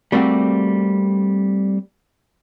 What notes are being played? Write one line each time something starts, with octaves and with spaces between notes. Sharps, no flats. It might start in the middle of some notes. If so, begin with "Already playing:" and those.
G3 A3 A#3 C4 F#4 G4